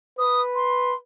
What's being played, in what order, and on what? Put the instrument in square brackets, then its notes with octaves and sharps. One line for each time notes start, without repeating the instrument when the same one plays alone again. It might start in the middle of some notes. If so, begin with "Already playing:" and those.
[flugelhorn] B4 [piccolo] D#6
[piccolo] C6